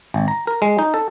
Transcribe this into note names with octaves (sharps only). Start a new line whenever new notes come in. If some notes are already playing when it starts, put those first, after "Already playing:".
G#1
A#5
A#4
G#3
D#4
A4